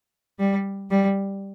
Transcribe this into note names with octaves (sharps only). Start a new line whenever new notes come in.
G3
G3